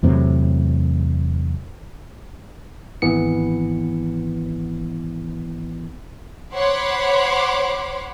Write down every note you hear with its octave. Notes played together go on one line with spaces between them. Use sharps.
E2 A2 C3 F#3
G#1 E3 B3 C#7
C5 C#5 F#5 B5 C6 D6